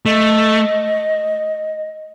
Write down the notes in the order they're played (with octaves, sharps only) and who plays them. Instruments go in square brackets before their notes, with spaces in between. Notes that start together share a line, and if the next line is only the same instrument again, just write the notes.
[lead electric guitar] A3 [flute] D#5